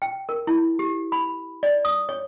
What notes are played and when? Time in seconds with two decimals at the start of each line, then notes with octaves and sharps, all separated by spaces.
0.02 G5
0.29 A#4
0.47 E4
0.79 G4
1.12 B5
1.63 D5
1.85 D#6
2.09 C#5